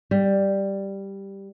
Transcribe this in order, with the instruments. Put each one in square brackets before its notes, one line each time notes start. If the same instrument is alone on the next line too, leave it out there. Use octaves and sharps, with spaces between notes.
[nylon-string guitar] G3